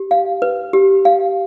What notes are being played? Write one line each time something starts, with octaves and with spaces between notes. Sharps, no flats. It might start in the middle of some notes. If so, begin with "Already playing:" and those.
Already playing: G4
F5
B4
G4
F5